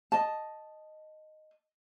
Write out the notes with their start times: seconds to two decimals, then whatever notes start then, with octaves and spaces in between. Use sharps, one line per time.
0.12 D#5 A5